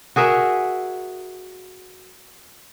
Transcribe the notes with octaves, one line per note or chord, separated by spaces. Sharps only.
F#4 G#4 A#4 E5